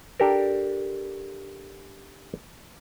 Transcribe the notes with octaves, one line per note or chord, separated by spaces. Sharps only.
D4 G4 A4 A#4